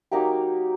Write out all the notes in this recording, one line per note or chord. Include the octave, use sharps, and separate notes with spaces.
F#3 A#3 D#4 G4